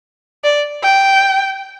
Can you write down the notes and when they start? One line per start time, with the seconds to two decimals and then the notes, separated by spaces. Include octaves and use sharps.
0.44 D5
0.83 G5